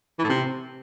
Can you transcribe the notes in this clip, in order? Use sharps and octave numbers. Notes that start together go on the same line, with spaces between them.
E3
A2
C3